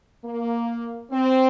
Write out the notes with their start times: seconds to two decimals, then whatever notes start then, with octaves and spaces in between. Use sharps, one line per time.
0.25 A#3
1.11 C4